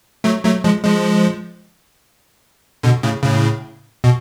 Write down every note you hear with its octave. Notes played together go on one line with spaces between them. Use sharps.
F#3 A3
F#3 A3
F3 G#3
F3 G#3
B2 D3
A2 C#3
A2 C#3
B2